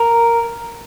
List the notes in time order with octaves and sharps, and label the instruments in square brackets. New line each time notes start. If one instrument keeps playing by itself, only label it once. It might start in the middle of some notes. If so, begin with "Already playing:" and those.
Already playing: [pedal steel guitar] A#4